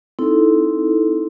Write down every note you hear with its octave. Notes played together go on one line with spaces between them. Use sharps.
C4 D#4 E4 A4